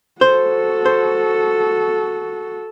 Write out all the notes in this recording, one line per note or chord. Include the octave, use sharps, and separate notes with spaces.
F#4 A4 C5
C5